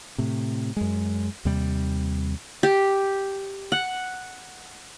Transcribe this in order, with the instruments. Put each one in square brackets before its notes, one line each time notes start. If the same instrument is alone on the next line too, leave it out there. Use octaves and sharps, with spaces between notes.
[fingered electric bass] A2 C3
F#2 G#3
D#2 C3 G3
[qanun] G4
F#5